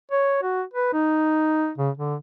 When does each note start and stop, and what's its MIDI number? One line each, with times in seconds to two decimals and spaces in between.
0.12 0.40 73
0.43 0.63 66
0.74 0.92 71
0.93 1.71 63
1.78 1.90 49
1.98 2.15 50